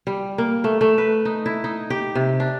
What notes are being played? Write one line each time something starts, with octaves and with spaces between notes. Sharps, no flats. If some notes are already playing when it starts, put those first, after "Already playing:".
G3
A#3
A3
A3
B4
D#4
E4
D#4
G4
C3
D4